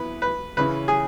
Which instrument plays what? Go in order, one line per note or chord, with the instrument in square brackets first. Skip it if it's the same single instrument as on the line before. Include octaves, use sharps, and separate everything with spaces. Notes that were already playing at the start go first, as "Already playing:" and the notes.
Already playing: [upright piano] E3 B3 E4 [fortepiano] B4
[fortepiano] B4
[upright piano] C#3 E3 C#4 E4 [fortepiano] B4
[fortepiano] G#4